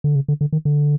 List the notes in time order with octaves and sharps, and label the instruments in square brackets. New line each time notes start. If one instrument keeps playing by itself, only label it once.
[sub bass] D3
C#3
D3
D3
D#3
D3